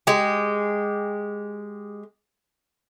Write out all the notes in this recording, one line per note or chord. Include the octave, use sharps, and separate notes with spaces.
G#3 G4